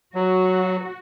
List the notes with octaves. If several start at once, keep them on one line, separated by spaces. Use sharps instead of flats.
F#3 F#4